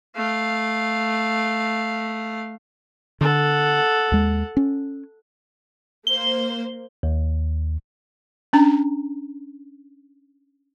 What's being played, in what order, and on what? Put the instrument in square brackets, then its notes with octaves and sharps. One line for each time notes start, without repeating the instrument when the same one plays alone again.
[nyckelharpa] A3 F5
[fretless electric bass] D3 [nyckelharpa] A4 F#5
[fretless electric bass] D#2 G#3
C#4
[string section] A#3 C5 [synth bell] G7
[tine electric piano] D#2
[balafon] C#4 D4 A#5